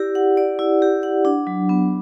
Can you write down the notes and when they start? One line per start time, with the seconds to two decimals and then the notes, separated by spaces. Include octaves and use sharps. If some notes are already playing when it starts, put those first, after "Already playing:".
Already playing: E4 G4 D5
0.15 F#5
0.37 D5
0.59 E4
0.82 G4
1.03 F#5
1.25 D4
1.47 F#3
1.69 B3